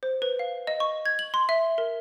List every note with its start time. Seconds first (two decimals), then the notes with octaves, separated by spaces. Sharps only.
0.03 C5
0.22 B4
0.39 F5
0.67 D#5
0.80 C#6
1.05 G#6
1.19 F#7
1.34 C6
1.49 E5
1.78 A#4